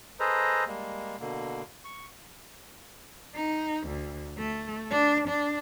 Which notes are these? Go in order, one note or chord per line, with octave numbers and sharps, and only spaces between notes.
G#4 A4 B4 C5 D#5 A#5
G3 G#3 A#3
B2 D3 A#3
C#6
D#4
D2
A3
D4
D4